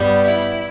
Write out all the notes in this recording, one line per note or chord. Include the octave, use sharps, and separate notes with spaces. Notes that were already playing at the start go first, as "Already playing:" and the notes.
Already playing: G2 G3 B3
E4